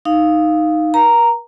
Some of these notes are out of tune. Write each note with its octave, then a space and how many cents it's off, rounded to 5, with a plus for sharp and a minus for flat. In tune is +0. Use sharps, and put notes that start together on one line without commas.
D#4 +0 F5 +0
A#4 +40 A#5 +0